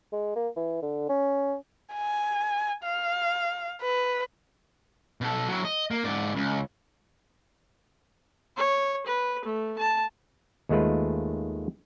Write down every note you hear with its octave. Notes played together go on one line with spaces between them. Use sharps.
G#3
A#3
E3
D3
C#4
G#5
F5
B4
B2 A4
F#3 E4
D#5
A#3
G#2 D5
C#2
C#5
B4
A3
A5
D#2 D#3 G#3 A3 F4 B4